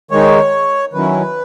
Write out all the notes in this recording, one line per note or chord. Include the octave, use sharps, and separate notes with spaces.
D#3 G#3 D#4 C#5
D#3 F#3 C#4 E4 B4